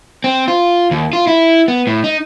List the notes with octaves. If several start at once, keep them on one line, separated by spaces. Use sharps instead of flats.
C4
F4
D#2
F4
E4
B3
A2
D#4